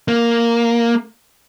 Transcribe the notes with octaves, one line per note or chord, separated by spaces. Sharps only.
A#3